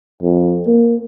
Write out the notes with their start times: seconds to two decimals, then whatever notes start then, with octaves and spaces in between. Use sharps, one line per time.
0.22 F2
0.67 A#3